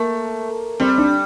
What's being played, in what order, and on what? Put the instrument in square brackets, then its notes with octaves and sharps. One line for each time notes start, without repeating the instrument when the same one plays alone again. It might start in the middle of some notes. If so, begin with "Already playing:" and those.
Already playing: [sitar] A3 [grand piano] A#3
[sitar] G3 [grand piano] C4
[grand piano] D4